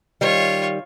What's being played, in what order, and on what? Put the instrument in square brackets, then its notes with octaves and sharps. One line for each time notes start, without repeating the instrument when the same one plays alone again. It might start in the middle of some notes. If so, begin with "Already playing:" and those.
[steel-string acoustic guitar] D#3 G3 [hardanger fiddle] F4 C#5